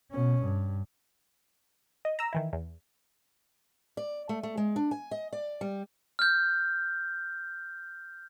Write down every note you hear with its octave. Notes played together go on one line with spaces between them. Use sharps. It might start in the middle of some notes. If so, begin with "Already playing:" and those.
B2 C#4
G2
D#5
A#5 E6
D#3 E3 E4
E2
D5
A3
A3
G#3
D4
G#5
D#5
D5
G3
F6 G6